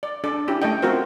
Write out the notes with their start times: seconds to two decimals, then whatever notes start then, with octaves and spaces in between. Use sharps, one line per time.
0.03 D5
0.24 D4 A4 D5
0.48 C#4 E4 G4
0.62 A3 A4 D#5 G5
0.82 C4 F4 F#4 A#4 C5